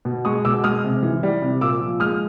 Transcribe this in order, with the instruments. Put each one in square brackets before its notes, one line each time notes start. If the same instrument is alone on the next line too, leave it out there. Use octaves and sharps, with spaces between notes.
[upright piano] B2
G#3 C#6 D#6
B2 D6 E6
G#3 D#6 F6
C3
E3
G3
C3
A#2 D6 E6
F3
G#3 D#6 F6